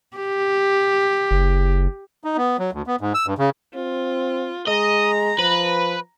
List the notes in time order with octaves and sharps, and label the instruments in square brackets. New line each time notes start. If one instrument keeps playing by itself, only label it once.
[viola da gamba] G4
[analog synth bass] F#1
[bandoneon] D#4
B3
F#3
D2
B3
G#2
E6
G2
C#3
[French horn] C4 [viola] F4
[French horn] G#3 [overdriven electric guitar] D#5 [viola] A#5
[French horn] F3 [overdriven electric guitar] B4